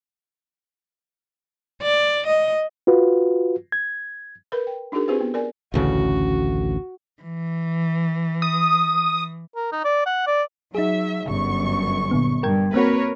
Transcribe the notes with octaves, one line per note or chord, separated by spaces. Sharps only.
D5
D#5
F4 F#4 B4
G#6
A#4 B4 B5
G5
D4 D#4 F#4 G#4 A#4
C4 F4 G4 G#4 B4 C5
B3
A#4 D5 G#5
A1 D2 C#3 F#4
E3
D#6
A#4
D#4
D5
F#5
D5
F#3 D#4 G#4 E5
G1 F#2 C#6
A#2 D3 B3
G2 A#4 G5 G#6
A#3 C4 F#4 A#4 B4 C#5